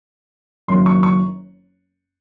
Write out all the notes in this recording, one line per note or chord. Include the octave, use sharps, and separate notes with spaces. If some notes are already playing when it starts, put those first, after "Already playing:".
F#1 F#2 D#3 F#3 A#3 C6
C#6
C#6